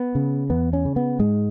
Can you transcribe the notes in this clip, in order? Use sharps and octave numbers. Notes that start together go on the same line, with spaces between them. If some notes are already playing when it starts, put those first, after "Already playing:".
Already playing: B3
C#3
E2 B3
C#4
C#3
B3
G#2 G#3